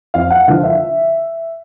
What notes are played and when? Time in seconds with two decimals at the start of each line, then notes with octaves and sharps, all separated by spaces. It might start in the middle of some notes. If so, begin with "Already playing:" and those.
0.14 F2 F5
0.30 F#5
0.47 D3 F3 F5
0.63 E5